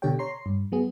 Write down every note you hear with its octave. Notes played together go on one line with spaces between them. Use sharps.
B2 D3 G4 A4 C#5 G5
C#5 A#5 C6 C7
G2
F#3 B3 G#4